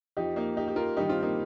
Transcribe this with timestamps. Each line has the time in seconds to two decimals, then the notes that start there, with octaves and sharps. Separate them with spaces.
0.17 F2 F3 D#4 G4
0.36 A#3 D#4
0.57 D#4 G4
0.68 G4
0.76 F4 A#4
0.97 G2 D#3 D#4 G4
1.09 C4 F4
1.22 A#3 D#4